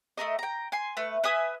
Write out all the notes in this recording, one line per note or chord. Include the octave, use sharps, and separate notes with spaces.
A3 C4 A#4 D#5
G5 A#5
G#5 C6
A3 B4
B4 E5 G#5 D#6